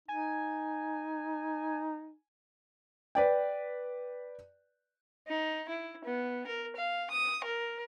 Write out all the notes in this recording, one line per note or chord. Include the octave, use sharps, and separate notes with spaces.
D#4 G#5
B4 D5 G5
D#4
E4
B3
A#4
F5
D#6
A#4